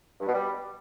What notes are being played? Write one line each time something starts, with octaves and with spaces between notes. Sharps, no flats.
G2
B2
G3